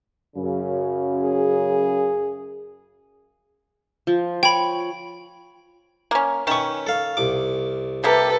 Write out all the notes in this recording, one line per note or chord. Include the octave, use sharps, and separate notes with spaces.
F#2 C#3
G#4
F3
C#5 G5 B5
A#3 C#4
D#3 C#4 B4 C#6
A4 F5
C2 D6
C3 A#3 G4 A4 B4